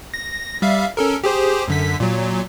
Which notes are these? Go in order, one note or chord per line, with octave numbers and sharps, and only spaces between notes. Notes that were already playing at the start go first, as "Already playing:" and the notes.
A#6
G3 E5 F5
C#4 A4 A#4
G4 G#4 C5
F#2 D3 B6
A#2 F#3